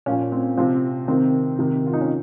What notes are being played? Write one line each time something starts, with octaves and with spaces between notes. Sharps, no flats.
A#2 F3 C#4
C4
C3 F3 C4
C3 D#3 C4
C3 D#3
F4
D#4
C#4